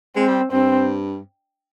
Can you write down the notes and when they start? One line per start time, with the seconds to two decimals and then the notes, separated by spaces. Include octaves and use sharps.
0.16 G#3 C4
0.28 G3
0.52 G2 C4